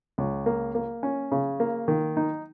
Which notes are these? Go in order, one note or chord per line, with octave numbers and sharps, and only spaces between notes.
C#2
A#3
A#3
C#4
C#3
A#3
D#3
D#4